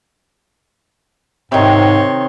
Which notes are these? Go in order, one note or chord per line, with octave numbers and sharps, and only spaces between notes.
G#2 C3 D#3 C#5 C6